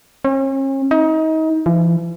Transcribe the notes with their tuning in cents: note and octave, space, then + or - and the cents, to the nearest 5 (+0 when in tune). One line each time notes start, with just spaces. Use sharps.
C#4 -40
D#4 +30
E3 +45